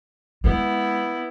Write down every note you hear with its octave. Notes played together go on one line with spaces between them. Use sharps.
G#3 B3 E4